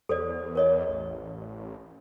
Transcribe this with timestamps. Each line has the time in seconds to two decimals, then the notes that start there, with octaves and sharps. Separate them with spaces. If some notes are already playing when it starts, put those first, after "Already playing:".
0.09 E2 A4 C5 D5
0.55 A#4 C#5 D#5
0.89 A1